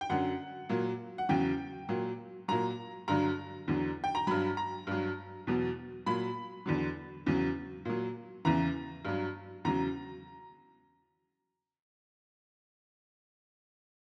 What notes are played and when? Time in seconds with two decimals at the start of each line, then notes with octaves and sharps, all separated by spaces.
0.01 G5
0.10 F#2 D3 F#3 F#5
0.69 A#2 F#3
1.18 F#5
1.29 E2 C#3 F#3 G5
1.89 A#2 F#3
2.48 A#2 F#3 A#5
3.08 G2 D3 F#3 A#5
3.68 E2 D3 F#3
4.04 G5
4.15 A#5
4.27 G2 F#3 B5
4.57 A#5
4.87 G2 F#3
5.47 E2 B2 F#3
6.06 A#2 F#3 B5
6.66 E2 D3 F#3
7.26 E2 C#3 F#3
7.85 A#2 F#3
8.45 E2 C#3 E3 A#5
9.05 G2 F#3
9.65 E2 C#3 F#3 A#5